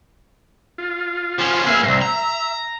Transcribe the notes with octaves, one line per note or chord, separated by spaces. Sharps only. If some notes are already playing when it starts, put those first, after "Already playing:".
F4
F3 C#4
A#3 G#4 B4 E5 F5
C2 G#2 E5 A#5 C6
E5 A#5